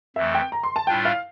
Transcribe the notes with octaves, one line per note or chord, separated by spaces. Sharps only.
F2 E3 A3 E5
G5
A#5
C6
A5
A2 G3 D4 F4 G5
F5